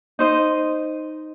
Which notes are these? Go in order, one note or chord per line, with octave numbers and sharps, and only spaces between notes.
D#4 C5 D#5